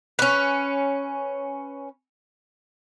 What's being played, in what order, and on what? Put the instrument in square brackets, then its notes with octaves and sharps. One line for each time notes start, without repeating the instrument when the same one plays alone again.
[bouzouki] C#4 B4